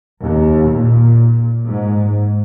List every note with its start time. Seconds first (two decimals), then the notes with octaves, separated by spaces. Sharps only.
0.24 D#2
0.74 A#2
1.67 G#2